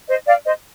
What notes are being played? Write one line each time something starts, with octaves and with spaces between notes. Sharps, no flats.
C5 D#5
D5 F5
C5 D#5